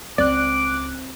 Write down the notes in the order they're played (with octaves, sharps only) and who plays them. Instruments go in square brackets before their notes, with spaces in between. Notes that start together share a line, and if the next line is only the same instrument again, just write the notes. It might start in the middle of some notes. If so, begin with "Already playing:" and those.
[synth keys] C#2 F#6 [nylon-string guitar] C4 [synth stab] D5 [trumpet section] D6